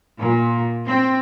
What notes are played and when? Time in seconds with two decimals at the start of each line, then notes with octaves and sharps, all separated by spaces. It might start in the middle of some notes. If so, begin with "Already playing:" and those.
0.18 A#2
0.86 C4